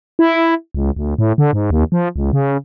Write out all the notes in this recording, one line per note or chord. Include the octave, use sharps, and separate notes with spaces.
E4
C#2
D2
A2
D3
G#2
D#2
F3
C#2
C#3